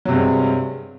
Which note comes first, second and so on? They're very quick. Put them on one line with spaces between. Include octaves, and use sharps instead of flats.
F#3 C3 G2 G#3